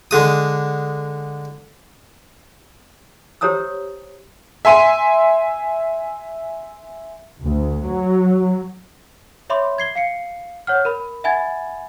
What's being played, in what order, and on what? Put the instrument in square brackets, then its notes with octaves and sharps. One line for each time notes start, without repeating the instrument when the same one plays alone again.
[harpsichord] D3 G#3 D#6
[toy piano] G4 C5 C#5 A#5 D#6 E6
[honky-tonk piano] E5 G#5 C6 D#7
[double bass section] D2
F#3
[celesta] C#5 E5 B5 C6 D6
G#6 C7 G7
F5 C7 C#7
C#5 F#5 F6
A#4 B5
E5 F#5 G#5 B5 G#6 A6